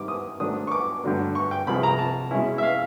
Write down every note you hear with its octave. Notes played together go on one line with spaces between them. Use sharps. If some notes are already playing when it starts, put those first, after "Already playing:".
Already playing: G#2 D#3 G3 C4 E4 D6
D#6
G#2 D#3 F#3 A3 D4 D#6
C#6
D6
G2 D3 F#3 A3 D4
C#6
G5
C2 C3 F3 G#3 B5
A#5
A5
B2 G#3 C#4 E4
E5
F5